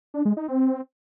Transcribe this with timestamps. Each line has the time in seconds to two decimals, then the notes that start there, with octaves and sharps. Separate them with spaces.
0.14 D4
0.25 G#3
0.37 D#4
0.48 C4